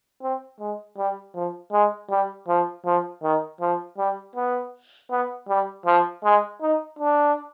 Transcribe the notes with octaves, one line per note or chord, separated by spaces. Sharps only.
C4
G#3
G3
F3
G#3
G3
F3
F3
D#3
F3
G3
B3
B3
G3
F3
G#3
D#4
D4